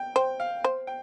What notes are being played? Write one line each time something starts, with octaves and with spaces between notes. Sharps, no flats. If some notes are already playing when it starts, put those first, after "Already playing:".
Already playing: G5
C5 G5
F5
C5
G5